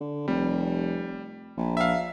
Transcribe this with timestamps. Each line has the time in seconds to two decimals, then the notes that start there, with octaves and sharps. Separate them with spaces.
0.01 D3
0.28 F1 G3
1.57 A#1
1.77 E5 F5